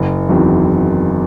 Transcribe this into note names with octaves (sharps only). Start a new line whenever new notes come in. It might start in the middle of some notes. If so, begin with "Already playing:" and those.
Already playing: F#1
E2 D#3 F#3 C4